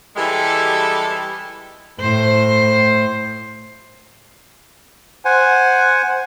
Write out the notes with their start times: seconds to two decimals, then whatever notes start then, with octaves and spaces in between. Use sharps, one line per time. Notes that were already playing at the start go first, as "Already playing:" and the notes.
0.16 E3 G3 G#3 G4 A4
2.00 A2 C5
5.25 C5 F#5 G#5